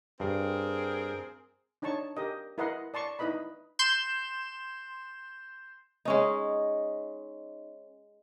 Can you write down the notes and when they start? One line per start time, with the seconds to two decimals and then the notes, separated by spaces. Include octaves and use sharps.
0.20 G2 C4 G#4 A#4
1.82 D4 D#4 C#5 A5 C#6
2.17 G4 A#4 D#5
2.58 E4 A#4 B4 D#5 F#5 C6
2.94 D5 A5 C6 C#6
3.19 D#4 E4 B4 D#5 B5
3.79 C6 G6 E7
6.05 G#3 C#4 D#4